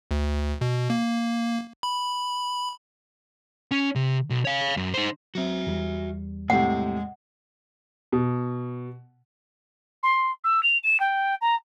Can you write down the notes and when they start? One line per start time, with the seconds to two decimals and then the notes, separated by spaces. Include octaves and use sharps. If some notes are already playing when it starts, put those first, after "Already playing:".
0.11 D2
0.61 B2
0.90 A#3
1.83 B5
3.71 C#4
3.95 C3
4.30 B1
4.45 C#5 F5
4.77 F#2
4.94 D#4 C5
5.35 F#3 C4 F#4 E5
5.67 E2 G3
6.50 A2 C3 G#3 F#5
8.12 B2
10.03 C6
10.44 E6
10.63 F7
10.84 E7
11.00 G5
11.41 A#5